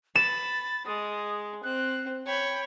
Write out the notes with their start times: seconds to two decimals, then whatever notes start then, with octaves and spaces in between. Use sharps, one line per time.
0.15 B5 A6 E7
0.86 G#3 D#6
1.63 C4 F#6
2.26 C#5 G5 B5